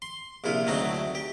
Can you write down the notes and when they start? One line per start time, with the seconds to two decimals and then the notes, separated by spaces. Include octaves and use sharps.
0.02 C6
0.44 A#1 C3 E4 F4
0.67 D2 F#3 A3 C4 D#4
1.15 G4